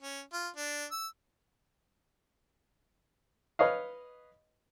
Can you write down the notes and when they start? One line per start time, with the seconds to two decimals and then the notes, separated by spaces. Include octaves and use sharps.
0.02 C#4
0.33 F4
0.57 D4
0.92 E6
3.59 B4 C#5 D#5 F5